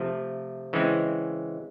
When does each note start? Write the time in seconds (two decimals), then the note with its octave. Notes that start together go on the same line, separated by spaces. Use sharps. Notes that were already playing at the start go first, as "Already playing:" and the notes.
Already playing: C3 F3 A3
0.73 C#3 E3 G#3 C4